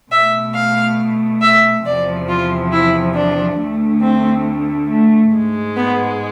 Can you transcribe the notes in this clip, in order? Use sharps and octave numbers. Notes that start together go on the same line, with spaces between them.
B2 A3 E5
F5
E5
E2 C3 F3 D5
F4
E4
D4
D2 D3 A3
C4
A3
G#2 G#3
B3